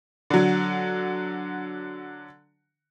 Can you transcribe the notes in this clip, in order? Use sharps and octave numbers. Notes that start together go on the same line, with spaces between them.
D3 F#3